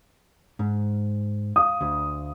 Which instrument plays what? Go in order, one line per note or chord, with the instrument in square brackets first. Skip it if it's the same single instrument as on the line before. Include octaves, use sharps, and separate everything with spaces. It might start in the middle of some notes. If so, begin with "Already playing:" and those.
[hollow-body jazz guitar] G#2
[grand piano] F5 D#6
[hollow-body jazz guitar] D2